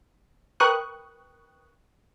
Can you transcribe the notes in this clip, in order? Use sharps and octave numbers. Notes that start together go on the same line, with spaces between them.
A#4 B4 G5 C#6 D#6 F#6